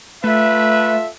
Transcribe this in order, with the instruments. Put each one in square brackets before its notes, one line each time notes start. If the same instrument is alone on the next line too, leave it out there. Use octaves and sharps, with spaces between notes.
[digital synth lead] A3 [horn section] F4 A4 E5 [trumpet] B4